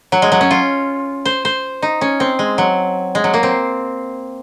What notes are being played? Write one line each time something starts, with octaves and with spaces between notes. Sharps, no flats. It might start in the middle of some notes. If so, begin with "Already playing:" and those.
F#3
G#3
F#3
C#4
F4
C5
C5
D#4
C#4
C4
G#3
F#3
G#3
F#3
A#3
C4